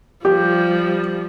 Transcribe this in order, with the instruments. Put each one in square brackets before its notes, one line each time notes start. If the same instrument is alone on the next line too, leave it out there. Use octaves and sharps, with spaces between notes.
[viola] F3 G3 [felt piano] G4